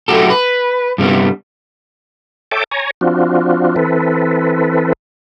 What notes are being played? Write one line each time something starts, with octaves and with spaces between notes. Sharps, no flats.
F#3 A3 F#4 G4 A4
B4
G2 C3 G3 B3
A4 C#5 E5 G5 A5 D6
C#5 G#5 A#5
F3 C4 D4 F4 F#4
E3 C4 A4 B4